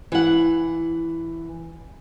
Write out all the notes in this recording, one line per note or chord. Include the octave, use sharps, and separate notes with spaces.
E3 F#5